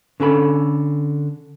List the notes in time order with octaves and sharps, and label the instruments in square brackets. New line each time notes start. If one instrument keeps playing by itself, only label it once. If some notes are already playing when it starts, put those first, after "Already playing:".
[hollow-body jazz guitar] D3 C#4 A4 B5